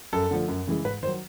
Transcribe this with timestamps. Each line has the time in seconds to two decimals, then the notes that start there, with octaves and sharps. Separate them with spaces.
0.13 F#2 A4
0.31 D3 F3 A3
0.48 F#2
0.67 C#3 E3 G#3
0.85 G#2 B4
1.03 D#3 C5
1.07 F#3